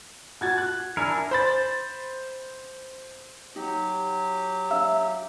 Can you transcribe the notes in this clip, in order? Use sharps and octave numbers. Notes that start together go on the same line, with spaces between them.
F#4 G#6 A6
F#6
D4 E4 A#4 G#5
C5 B5 A6
F#3 D#4 G4
D4 E5 F5 E6